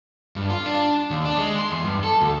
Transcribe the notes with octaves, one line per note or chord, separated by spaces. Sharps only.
G2
F4
D4
D#2
D4
G#3
C6
E2
G2
A4
D2